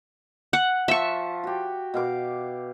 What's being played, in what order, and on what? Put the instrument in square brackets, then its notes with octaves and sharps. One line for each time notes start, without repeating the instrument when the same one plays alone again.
[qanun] F#5
[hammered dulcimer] F3 [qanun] E5 C#6
[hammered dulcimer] F#4 G4
B2 F5 D6